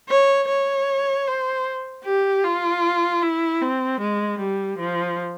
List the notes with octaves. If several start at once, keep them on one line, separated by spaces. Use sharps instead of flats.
C#5
C#5
C5
G4
F4
E4
C4
G#3
G3
F3